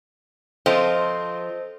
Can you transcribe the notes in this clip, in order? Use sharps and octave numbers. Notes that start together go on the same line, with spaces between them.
F3 C4 F4 A4 C5 D#5